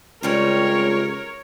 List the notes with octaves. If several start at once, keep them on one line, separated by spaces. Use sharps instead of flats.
C#2 C#3 G3 C4 A#4 C#5